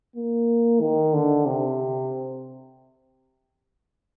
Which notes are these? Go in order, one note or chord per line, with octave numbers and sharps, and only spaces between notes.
A#3
D#3
D3
C3